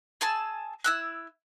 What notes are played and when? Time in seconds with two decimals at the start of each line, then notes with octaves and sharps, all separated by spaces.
0.21 G#4 G#5 A5 E6
0.84 E4 E6 F#6